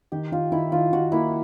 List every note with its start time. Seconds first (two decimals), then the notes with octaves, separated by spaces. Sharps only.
0.12 D#3 G4
0.32 D#3 F4
0.52 D#3 E4
0.72 D#3 F4
0.93 D#3 F#4
1.12 A#3 E4